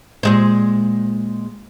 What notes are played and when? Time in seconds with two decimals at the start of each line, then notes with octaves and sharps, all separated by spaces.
0.23 A#2 G#3 C5